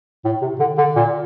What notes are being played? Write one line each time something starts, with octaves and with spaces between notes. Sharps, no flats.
A2
C3
D3
D3
A#2